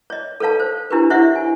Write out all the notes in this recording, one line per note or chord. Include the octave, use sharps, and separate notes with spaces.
C#5 D#5
A4 B4 C#5 F5 A5
C5
D4 E4 G4 A#4 B4
E4 C5 C#5 D#5 E5 F#5
G#5